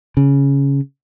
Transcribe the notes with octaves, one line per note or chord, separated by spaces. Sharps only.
C#3